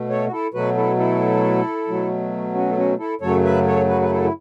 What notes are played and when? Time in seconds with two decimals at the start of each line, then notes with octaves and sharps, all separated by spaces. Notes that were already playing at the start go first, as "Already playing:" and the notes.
Already playing: B2 A3
0.10 A4 C#5
0.27 F#4
0.32 E4 A4
0.54 B2 F#3 A3 F#4 B4
0.77 E4 A4
0.98 E4 A4
1.88 B2 F#3 A3
2.54 C#4 F#4
2.70 A4
2.77 C#4 F#4
2.99 E4 A4
3.21 F#2 C#3 F#3 A3 A4 C#5
3.44 B4 E5
3.66 A4 C#5
3.88 F#4 B4
4.02 B4
4.10 E4 A4
4.23 E4